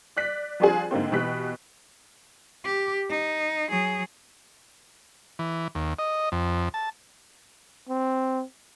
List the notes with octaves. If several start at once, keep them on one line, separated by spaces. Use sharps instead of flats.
D5 F#6 B6
F3 G3 C4 D4 F4 G#4
G#2 D3 A#3 C4
B2 E3 G4 B4 F#6 B6
G4
D#4
F#3 G#4
E3
D#2
D#5
F2
A5
C4